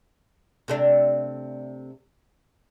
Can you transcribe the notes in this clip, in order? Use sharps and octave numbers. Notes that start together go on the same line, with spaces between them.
C3 A3 D4